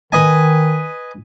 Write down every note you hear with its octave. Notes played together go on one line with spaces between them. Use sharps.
D#3 B4 D#5 G#5